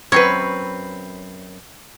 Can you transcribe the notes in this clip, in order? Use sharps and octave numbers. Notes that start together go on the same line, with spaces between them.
F#2 C4 B4 C#5